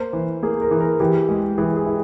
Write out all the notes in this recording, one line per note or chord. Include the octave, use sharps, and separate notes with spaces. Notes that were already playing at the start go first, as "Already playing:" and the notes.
Already playing: A#3 C5
E3
A#3 G#4
A#4
E3
A#4
E3 G4
G#3
E3 G#4
G#4
E4